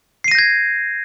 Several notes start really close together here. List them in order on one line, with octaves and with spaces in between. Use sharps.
C7 D#7 A#6 G6 G#6